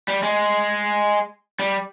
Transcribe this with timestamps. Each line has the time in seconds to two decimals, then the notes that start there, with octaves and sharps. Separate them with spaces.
0.08 G3
0.23 G#3
1.59 G3